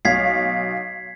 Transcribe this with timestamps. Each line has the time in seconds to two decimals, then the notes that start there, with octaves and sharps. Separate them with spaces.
0.05 B1 F5 G#6 B6 C7